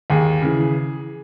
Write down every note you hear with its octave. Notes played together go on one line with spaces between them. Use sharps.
D#2 G#4
C#3 E3